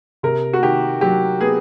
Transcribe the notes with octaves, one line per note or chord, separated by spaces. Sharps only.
C3 A#4
F#4
D#3 G4
F#3 G4
B3 G#4